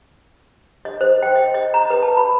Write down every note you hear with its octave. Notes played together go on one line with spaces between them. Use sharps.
D#5
C5
G5
D#5
D#5
A#5
B4
A5
B5